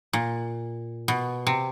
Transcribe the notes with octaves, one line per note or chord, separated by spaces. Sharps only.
A#2
B2
C3